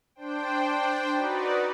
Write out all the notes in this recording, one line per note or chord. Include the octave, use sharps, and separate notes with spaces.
D4 C5 G5
D#4 F#4 B4 D5